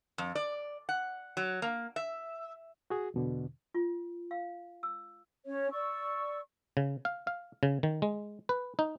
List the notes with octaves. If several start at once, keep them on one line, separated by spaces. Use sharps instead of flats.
F2
D5
F#5
F#3
A#3
E5
F#4 G#4
E2 B2 D3
F4
F5
E6
C#4 C#5
D5 C#6 E6
C#3
F5
F5
C#3
D#3
G#3
B4
D#4